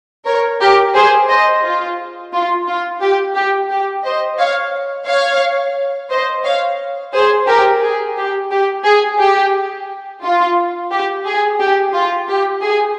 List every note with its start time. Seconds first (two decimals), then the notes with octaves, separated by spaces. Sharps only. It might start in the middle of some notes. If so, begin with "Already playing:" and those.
0.26 A#4 C#5
0.61 G4 A#4
0.95 G#4 C5
1.30 C5 D#5
1.63 F4
2.33 F4
2.67 F4
3.01 G4
3.35 G4
3.70 G4
4.05 C5 D#5
4.38 C#5 F5
5.07 C#5 F5
6.10 C5 D#5
6.44 C#5 F5
7.13 G#4 C5
7.48 G4 A#4
7.82 G#4
8.17 G4
8.51 G4
8.85 G#4
9.20 G4
10.23 F4
10.91 G4
11.26 G#4
11.60 G4
11.94 F4
12.29 G4
12.62 G#4